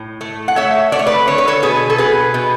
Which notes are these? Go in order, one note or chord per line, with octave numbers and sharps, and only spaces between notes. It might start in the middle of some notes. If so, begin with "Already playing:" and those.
Already playing: A2
A3
F#5
A3 C#5 E5
A3 D5
C#5
B4 D5
D3 C#5
B4
A4 C#5
B2 G#4 B4
A4
B2 G#4 B4
B2